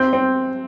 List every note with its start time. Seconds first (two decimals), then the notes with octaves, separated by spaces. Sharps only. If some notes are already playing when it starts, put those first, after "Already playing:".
Already playing: C4 G6
0.13 C4